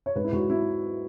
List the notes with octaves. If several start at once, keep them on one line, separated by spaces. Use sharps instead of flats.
C#5
G#2 B4
E4
G#2 F#4
F#3 E4